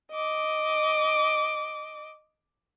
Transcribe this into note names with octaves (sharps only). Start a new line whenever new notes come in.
D#5 D6